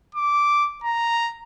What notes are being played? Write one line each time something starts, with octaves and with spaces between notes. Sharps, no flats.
D6
A#5